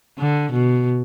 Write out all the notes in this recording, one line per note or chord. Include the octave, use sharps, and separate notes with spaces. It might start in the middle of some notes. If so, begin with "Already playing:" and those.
D3
B2